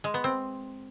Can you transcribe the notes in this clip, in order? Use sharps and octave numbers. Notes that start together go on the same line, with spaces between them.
G#3
B3
C4